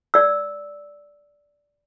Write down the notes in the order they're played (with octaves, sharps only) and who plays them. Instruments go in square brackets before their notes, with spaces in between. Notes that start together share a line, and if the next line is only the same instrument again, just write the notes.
[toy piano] D5 E6